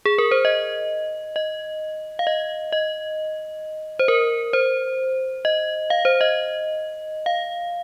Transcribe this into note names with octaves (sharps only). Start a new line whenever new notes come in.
G#4
A#4
C5
D#5
D#5
F5
D#5
D#5
C5
A#4
C5
D#5
F5
C5
D#5
F5